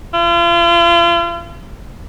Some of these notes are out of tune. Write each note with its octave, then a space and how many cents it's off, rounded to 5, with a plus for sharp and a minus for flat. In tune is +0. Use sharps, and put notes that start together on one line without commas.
F4 -40